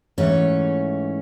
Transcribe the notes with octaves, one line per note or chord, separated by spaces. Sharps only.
G#2 E3 A3 C#4